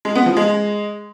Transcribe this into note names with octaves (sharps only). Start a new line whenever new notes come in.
G#3
B3
F3
G#3